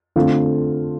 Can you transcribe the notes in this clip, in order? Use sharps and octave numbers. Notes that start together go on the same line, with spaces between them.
D3 A3 C4 F4